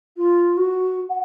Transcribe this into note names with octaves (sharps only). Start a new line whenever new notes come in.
F4
F#4
F#5